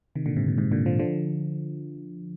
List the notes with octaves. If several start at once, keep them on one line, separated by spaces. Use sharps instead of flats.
C3 D#3
A#2 D3
G#2 C3
A#2
G#2 C3
A#2 D3
D3 F3
D3 F3